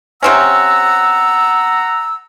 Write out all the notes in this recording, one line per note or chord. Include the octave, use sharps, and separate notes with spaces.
C3 C4 C#4 F#5 A#5 E6